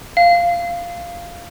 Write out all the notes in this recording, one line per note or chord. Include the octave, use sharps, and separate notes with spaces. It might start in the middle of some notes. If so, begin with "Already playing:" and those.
F5